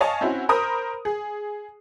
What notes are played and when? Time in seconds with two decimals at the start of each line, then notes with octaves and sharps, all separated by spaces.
0.01 C#5 D#5 F5 G#5 A5 C#6
0.21 C4 C#4 E4 F#4
0.49 A#4 C5 B5 D#6
1.05 G#4